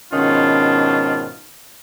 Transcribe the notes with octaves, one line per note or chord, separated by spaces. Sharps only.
G#2 B2 D#3 C#4 D4 F4